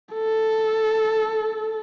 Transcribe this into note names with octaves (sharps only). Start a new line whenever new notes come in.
A4